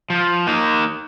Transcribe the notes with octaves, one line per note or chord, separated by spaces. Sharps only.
F3
A#3 D#4